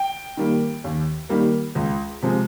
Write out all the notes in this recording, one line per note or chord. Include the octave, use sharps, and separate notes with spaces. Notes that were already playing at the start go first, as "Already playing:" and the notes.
Already playing: G5
D#3 G3 A#3
D#2
D#3 G3 A#3
C#2
C3 F3 G#3